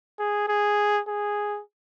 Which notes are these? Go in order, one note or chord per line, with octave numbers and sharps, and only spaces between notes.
G#4
G#4
G#4